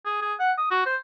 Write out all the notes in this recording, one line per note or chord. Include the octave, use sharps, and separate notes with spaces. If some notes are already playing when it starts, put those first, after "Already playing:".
G#4
G#4
F#5
D#6
F#4
C5